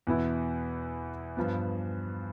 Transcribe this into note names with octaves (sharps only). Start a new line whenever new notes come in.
E2 B2 B3 E4
G2 F3 B3